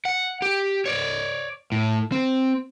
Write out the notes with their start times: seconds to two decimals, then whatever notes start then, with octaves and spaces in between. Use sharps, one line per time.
0.05 F#5
0.42 G4
0.85 C#5 D5
1.72 A2
2.12 C4